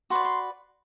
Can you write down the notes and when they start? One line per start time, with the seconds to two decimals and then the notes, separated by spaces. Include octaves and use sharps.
0.10 F#4 B4 D5 C6
0.25 C6